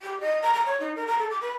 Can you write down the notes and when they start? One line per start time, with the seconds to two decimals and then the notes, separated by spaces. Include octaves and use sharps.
0.02 G4
0.20 D#5
0.42 A#5
0.53 A#5
0.66 C#5
0.80 D#4
0.96 A#4
1.07 A#5
1.19 A4
1.30 D6
1.41 B4